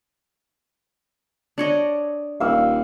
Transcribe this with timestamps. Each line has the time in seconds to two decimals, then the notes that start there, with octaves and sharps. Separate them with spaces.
1.58 D4 C#5 D#5
2.40 D#1 F5 E6